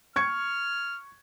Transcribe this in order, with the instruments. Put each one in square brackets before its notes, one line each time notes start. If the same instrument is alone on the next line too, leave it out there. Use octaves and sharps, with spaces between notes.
[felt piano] C#6 G#6 C#7 [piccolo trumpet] F6